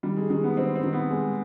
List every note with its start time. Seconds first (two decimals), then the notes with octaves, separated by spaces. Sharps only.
0.03 D#3 G3
0.17 G#3
0.30 D#3 G#3
0.43 B3
0.57 D#3 C4
0.75 C4
0.84 D#3
0.93 B3
1.10 G#3